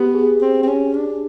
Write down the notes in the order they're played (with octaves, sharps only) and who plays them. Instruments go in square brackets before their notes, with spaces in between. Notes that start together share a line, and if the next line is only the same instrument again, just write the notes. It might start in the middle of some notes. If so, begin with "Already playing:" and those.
Already playing: [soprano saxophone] B3 [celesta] G4
[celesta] G#4
[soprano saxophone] C4
C4
C#4
D4